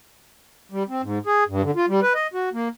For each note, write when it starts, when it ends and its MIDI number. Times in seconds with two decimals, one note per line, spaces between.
0.72 0.83 55
0.88 1.02 60
1.03 1.19 44
1.26 1.44 68
1.48 1.62 43
1.63 1.71 50
1.76 1.86 65
1.88 2.00 55
2.02 2.13 71
2.15 2.27 75
2.34 2.49 66
2.53 2.68 58